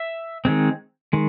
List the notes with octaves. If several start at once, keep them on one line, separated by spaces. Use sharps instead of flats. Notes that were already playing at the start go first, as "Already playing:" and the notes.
Already playing: E5
D#3 G#3 C4
D#3 G#3